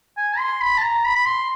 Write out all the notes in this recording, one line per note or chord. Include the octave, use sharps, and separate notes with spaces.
G#5
C6
B5
A5
A#5
B5
B5
C6